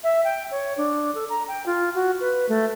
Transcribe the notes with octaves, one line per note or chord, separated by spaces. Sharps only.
E5
G5
C#5
D4
A4
A#5
G5
F4
F#4
B4
A3